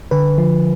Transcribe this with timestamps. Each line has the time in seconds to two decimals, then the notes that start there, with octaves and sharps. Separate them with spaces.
0.11 D3 B4
0.38 F3